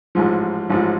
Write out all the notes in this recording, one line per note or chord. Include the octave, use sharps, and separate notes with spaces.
A1 G#2 F3
A1 G#2 F3